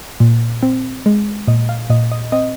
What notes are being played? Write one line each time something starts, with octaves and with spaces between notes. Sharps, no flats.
A#2
C4
G#3
A#2 D#5
F5
A#2 D#5
D#5
C4 D#5